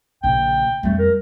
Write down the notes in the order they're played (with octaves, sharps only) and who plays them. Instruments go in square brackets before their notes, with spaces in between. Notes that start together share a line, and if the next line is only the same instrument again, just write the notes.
[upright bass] A#1 C#3 [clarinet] G5
[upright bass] F2 G3 [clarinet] A3
[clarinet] A#4